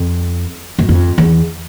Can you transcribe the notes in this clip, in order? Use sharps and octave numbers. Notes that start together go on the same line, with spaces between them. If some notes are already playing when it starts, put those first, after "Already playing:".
Already playing: F2
F#2
F2
E2